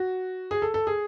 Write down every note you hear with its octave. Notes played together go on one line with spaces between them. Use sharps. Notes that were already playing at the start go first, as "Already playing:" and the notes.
Already playing: F#4
G#4
A4
A4
G#4